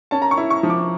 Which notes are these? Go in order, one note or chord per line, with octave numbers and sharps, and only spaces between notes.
C#4 A5
A#5
C#6
E4
C#6
F3
D6